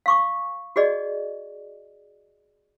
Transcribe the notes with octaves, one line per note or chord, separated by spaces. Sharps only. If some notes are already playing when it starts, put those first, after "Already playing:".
F5 C#6 D6
F#4 G#4 D5 D#5